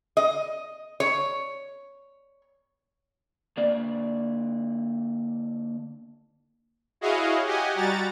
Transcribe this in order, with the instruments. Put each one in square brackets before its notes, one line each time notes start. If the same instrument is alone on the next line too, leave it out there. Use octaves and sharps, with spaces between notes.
[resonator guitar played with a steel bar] D#5
C#5
[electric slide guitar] D3 A#3 D5
[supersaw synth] E4 F#4 G#4 C#5 D#5 F5
G4 D#5 F#5 G#5
G3 F#4 A#5 A6